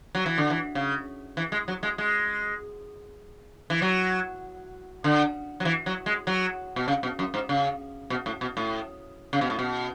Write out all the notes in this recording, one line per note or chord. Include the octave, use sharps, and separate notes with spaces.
F#3
E3
D3
E3
C#3
E3
G#3
F#3
G#3
G#3
E3
F#3
D3
F#3
E3
F#3
G#3
F#3
B2
C#3
B2
F#2
G#2
C#3
B2
A2
B2
A2
C#3
B2
A2
B2